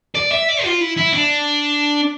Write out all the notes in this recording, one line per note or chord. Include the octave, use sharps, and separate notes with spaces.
D5
E5
D5
F4
E4
E4
D4